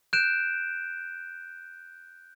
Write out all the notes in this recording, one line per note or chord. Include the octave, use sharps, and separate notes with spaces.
F#6 G6 D7 E7